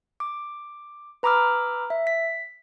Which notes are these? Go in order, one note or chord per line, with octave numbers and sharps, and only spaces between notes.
D6
B4 A#5 B5 D6 E6 F6
E5
B6